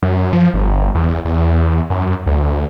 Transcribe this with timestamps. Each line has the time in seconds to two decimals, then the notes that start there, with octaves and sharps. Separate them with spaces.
0.02 F#2
0.33 F3
0.54 G1
0.95 E2
1.25 E2
1.90 F#2
2.26 D2